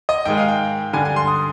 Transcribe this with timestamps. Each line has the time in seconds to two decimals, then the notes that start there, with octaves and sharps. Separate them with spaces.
0.09 D#5
0.25 G#2 D#3 G#3 G5
0.37 F5
0.48 G5
0.93 G2 D3 G3 G#5
1.05 G#5
1.16 C6
1.27 D#6